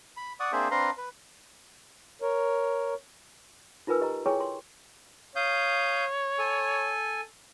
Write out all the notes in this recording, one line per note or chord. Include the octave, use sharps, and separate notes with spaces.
B5
D5 F#5 C#6 D#6
A#3 C4 D4 G#4 C5 E5
C4 D4 B4 F5 A#5 C6
B4
A#4 C#5
D#4 F4 A#4 B4 G#5 E6
G4 D#5 A#5
E4 G#4 C#5 G5 G#5 C#6
C6
C#5 F5 D#6 G6
A4 G#5